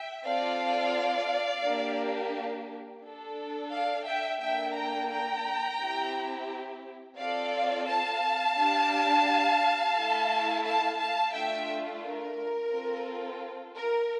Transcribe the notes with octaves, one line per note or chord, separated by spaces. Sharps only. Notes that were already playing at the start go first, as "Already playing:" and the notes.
Already playing: E5 G5
C4 F4 A4 D5 F5
A#3 D4 G4
D4 A4
D5 F5
E5 G5
A#3 D4 A4 E5 G5
G5 A#5
G5 A#5
C4 E4 G4
C4 F4 A4 D5 F5
F5 A5
D4 G4
A3 E4 A4
F5 A5
F5 A5
A3 D4 F4 E5 G5
A#4
C4 F4 A4
A#4